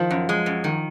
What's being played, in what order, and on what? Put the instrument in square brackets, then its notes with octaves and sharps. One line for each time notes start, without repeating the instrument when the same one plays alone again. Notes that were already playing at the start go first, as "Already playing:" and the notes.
Already playing: [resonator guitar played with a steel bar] D#3 [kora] F3
[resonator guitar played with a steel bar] F#2
G#3
F#2
D#3